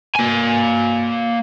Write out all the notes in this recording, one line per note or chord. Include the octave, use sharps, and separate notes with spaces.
A#3 G#5